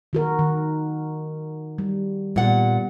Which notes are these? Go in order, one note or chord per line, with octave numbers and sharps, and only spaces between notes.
D#3 F#4 A#4
D#3
G3
A#2 G3 B3 F#5